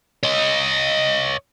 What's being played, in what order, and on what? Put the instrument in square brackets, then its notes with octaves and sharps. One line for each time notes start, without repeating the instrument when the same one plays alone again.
[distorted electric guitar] C#5 D#5